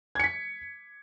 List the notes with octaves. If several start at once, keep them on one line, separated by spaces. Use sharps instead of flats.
G#6 B6 C#7